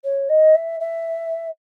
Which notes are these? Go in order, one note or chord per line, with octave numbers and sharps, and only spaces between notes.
C#5
D#5
E5
E5